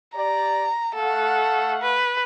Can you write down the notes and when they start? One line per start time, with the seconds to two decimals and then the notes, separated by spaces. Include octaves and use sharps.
0.16 G4 D5 A#5
0.95 A3 A4 F5 F#5
1.82 B4